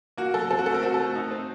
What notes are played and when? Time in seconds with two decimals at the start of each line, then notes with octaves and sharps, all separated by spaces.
0.18 A#3 F#4
0.34 F#3 A4
0.51 C4 A4
0.59 F#4
0.66 A3 A4
0.74 A#4
0.82 C4 F#4
0.94 A4
1.00 A3 F#4
1.15 D#4
1.31 C4